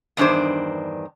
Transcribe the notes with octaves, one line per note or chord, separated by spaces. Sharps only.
E2 G2 D#3 D4 C5